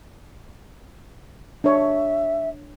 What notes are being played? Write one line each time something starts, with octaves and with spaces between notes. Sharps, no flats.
D4 C#5 E5